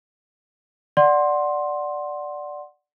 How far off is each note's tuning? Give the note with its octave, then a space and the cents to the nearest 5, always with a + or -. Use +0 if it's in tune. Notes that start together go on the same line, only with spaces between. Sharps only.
D5 +0 F#5 +0 C6 +10